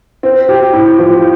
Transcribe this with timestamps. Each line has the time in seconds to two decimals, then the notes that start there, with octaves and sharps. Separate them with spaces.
0.23 C4
0.49 G4
0.74 A2
0.99 F3